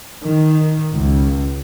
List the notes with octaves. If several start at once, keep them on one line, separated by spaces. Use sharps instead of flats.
D#3
C#2